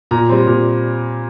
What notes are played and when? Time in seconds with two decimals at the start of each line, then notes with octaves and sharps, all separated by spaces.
0.11 A#2 A#5
0.29 G3 C4
0.47 A#2